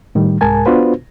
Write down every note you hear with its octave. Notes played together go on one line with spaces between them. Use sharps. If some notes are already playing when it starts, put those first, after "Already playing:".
A2 D#3 G3
C2 G#2 G#3 A#4 G#5 A5
B3 D4 F4 F#4 B4 C5